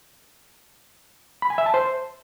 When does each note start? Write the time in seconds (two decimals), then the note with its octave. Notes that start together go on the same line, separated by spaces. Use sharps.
1.42 B5
1.50 G#5
1.58 E5
1.66 A5
1.74 C5